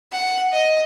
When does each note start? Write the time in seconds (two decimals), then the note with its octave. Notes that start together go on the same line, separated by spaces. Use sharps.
0.12 F#5
0.52 D#5